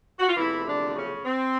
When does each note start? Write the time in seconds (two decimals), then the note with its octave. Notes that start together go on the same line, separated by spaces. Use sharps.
0.20 F#4
0.29 F4
0.37 E2 C3 E3 F3 A3 E4
0.67 D3 D4
0.95 C#3 C#4
1.25 C4